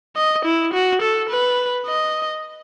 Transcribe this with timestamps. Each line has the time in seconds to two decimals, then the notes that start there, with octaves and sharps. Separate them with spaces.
0.17 D#5
0.45 E4
0.73 F#4
1.02 A4
1.30 B4
1.87 D#5